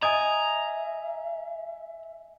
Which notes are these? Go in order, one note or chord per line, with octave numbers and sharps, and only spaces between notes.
D#5 E5 G#5 A#5 D#6 G#6